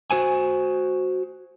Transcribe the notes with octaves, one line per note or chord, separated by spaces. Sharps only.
F#4 C5 G#5